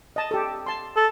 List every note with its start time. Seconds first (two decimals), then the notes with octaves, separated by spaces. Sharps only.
0.16 D#5 A5
0.31 G4 A4
0.66 A5 C6
0.96 A4